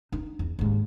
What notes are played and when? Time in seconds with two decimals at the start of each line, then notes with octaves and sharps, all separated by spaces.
0.12 D#4
0.39 E2
0.59 D#2 G#2